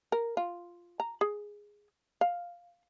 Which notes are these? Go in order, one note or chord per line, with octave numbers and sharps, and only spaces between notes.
A#4
F4
A#5
G#4
F5